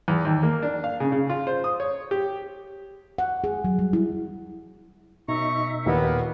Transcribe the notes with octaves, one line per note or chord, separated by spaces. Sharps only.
E2
D#2
A#3
D4
F5
C#3
C#3
F4
C5
D#6
C#5
G4
F#5
G#4
F#3
G3
E4
F#2 B2 D#4 E5 A#5 C#6
D#2 A#2 D#3 A#3 B3